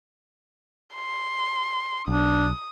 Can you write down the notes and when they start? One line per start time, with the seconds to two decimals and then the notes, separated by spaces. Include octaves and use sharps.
0.95 C6
2.08 B1 D4 D#6